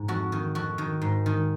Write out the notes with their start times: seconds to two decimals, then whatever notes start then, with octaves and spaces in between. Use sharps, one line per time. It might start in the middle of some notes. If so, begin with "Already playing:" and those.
Already playing: G#2
0.08 F2 F#4
0.32 D#3
0.55 F2 F#4
0.78 D#3
1.02 G#2
1.26 D#3